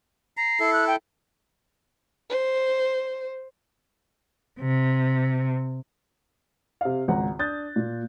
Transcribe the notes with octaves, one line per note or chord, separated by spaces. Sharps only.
A#5 C7
E4 A4
F#6
G5
C5
C3
C3 F5
G#1 C#2 F#5 A#5
D4 D#6 F#6 G6 A6
A#2